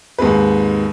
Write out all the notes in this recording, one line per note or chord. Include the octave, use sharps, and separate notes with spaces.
D#2 G#2 G#3 C4 B4